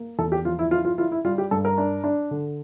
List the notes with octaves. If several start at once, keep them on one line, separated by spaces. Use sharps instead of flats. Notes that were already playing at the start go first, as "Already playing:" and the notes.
Already playing: A#3
E2 A4
G4
F3 F4
E4
E4 F4
F4
E4 F4
E4
G3 F4
G4
G2 A4
A#4
D4
D4
D3